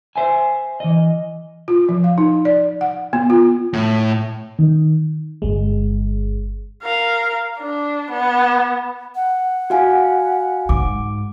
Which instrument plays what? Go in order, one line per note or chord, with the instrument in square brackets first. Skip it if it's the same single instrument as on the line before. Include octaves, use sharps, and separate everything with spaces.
[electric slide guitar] C5 E5 G#5
E3 D#5
[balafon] F4
F3
F5
D#4
D5
F#5
B3
F4
[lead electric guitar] A2
[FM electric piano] D#3
G1 G#3
[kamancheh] A#4 F5
D4
B3
[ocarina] F#5
[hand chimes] F#4 F5 G#5
[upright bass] G#2 [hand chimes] D6